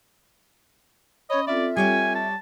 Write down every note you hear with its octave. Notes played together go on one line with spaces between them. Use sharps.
C#4 C#5 D#5 B5
C4 F4 A4 D5 E5
G3 C#5 G5 G#5
A5